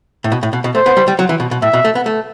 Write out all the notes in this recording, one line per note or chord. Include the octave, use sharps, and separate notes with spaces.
A2
B2
A2
B2
B2
A3 C5
B3
G3
G3
F#3
E3
B2
B2
A2 E5
B2
A3
B3
A3